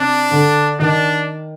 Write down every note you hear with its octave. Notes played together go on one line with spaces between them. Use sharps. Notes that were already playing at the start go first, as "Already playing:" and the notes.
Already playing: C3 D4
D3
D#3 D4